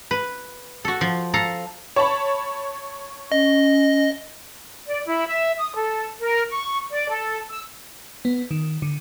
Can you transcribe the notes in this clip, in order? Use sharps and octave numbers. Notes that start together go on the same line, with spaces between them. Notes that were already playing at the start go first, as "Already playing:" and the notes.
B4
F#4 A4
F3
A4 F5 A#5
C#5 A5 B5
C#4 D#5
D5
E4
E5
D#6
A4
A#4
C#6
D5
A4
E6
B3
D#3
D3